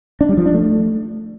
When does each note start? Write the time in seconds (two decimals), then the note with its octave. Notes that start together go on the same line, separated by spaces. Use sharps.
0.21 D4
0.29 G3
0.37 F3
0.46 D4
0.54 A3